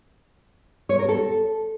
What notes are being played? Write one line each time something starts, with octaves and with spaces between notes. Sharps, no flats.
C#5
A#4
A4